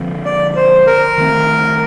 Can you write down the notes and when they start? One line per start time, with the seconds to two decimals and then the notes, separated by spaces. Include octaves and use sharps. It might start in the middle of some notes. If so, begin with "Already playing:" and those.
Already playing: D3 F3 C4
0.25 D5
0.56 C5
0.87 A#4
1.18 D#3 A3 C4